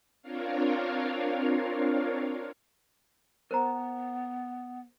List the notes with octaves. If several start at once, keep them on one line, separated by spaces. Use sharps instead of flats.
C4 D4 F4 A#4 C#5 F5
B3 A#4 C5 A#5